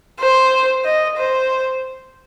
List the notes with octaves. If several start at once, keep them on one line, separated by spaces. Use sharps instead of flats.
C5
D#5
C5